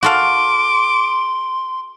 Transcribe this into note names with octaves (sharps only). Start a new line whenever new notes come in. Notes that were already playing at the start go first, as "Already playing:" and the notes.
F#4 A4 F5 C6 D6